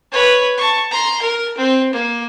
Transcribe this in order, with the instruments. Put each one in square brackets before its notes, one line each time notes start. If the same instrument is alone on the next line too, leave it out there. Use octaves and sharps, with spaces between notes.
[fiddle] B4 C#5
A5 C#6
A#5 C6
A#4
C4
A#3